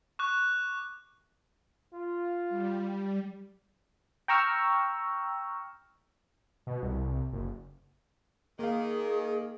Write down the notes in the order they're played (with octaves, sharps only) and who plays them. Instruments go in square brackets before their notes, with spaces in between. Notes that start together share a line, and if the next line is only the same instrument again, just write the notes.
[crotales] C#6 D6 F#6
[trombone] F4
[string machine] G3
[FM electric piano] G5 A#5 C#6 E6 F6
[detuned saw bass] B2
C2
F#1
[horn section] D#3 [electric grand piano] A#3 F5 [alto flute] G#4